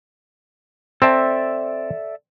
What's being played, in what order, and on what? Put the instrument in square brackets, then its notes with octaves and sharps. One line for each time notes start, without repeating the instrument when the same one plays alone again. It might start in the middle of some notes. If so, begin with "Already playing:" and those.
[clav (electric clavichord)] C4 A5 [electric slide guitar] A4 D5 E5